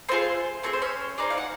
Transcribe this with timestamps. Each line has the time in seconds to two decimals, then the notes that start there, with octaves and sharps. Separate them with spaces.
0.09 A3 C4 F4 G#4 C5
0.63 A3 C4 G#4 C#5
0.73 C5
0.82 C#4 C#5
1.18 C4 D4 D#4 G#4 D5
1.30 F5
1.38 F#5